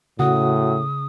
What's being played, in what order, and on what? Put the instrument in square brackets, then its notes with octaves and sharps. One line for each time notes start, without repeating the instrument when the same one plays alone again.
[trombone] A2 [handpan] C#3 [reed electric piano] F#4 F#5 [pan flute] D#6